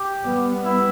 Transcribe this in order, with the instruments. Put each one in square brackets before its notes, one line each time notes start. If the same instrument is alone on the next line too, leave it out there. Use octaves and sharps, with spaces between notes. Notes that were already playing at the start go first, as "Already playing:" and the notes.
Already playing: [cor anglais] G4
[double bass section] G3 B3
[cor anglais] E4